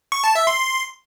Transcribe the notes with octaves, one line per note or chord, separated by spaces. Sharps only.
C#6
A5
E5
C6
C6